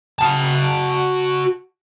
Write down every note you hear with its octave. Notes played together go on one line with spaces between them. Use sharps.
F#4 A5